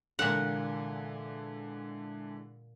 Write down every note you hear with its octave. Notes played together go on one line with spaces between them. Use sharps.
A#2 D3 E3 G#3 F#5